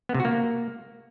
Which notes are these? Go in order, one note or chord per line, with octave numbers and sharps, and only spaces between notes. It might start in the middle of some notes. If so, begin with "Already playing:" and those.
B3
C3
F#4
A#3